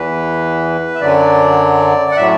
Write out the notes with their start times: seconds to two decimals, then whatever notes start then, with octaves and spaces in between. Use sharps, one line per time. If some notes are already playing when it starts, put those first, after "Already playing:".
Already playing: E2 E3 B4
0.95 E5
1.00 F#2 D3 F#3 D5
2.11 F#5
2.17 A2 F#3 E5